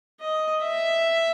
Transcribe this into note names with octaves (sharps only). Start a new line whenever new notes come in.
D#5
E5